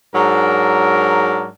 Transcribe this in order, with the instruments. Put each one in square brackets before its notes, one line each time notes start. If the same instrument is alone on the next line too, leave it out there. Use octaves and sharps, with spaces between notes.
[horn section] G#2 F#3 D4 A#4